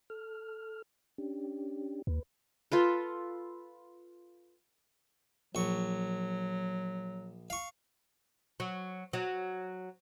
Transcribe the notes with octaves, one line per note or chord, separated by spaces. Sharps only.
A4 F6
C#4 D4 G4
D#2 B4
F4 A4 B4
A#1 F#3 C#6
F5 C#6
F#3
F#3